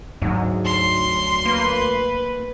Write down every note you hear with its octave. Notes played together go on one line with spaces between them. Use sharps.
D2 G#2 F#3
C6
A#3 B4